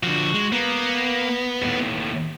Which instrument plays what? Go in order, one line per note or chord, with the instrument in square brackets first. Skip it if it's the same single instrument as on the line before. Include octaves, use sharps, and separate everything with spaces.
[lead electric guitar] D3 F3 [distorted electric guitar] F#4
[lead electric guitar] G#3
[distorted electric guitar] A#3 [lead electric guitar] B3
[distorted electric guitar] D#2 A2